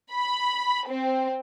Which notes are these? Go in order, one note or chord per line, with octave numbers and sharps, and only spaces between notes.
B5
C4